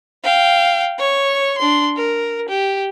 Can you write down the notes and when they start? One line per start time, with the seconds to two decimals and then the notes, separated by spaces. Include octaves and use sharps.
0.23 F5 G5
0.99 C#5 C#6
1.58 D4 C6
1.96 A#4
2.49 G4